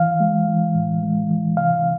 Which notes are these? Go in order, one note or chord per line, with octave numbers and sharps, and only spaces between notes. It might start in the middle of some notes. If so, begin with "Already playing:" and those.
Already playing: E3 F5
G#3
E3
A2
G#3
E3
C3 F5